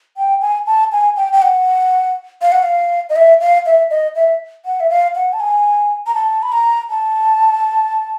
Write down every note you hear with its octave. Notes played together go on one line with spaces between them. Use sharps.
G5
G#5
A5
G#5
G5
G5
F#5
F5
F#5
F5
D#5
E5
F5
E5
D#5
E5
F#5
E5
F5
F#5
A5
G#5
A#5
A5
B5
A#5
A5